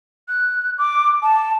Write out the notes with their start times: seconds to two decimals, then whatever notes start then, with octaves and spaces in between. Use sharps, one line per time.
0.28 F#6
0.78 D6
1.23 A5